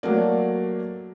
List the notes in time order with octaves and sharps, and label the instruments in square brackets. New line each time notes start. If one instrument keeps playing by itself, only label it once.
[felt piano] F#3 A3 A#3 D5